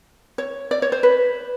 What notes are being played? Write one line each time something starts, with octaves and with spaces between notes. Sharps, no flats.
C#5
D5
C#5
C5
B4